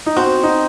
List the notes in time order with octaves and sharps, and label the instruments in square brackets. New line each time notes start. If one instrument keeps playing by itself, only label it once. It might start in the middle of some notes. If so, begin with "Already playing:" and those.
[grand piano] D#4
[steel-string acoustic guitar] C4 [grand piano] F#4
[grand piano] D#4